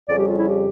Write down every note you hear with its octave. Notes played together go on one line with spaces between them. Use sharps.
F2 C#3 G3 D5
G4
F4
E4
G4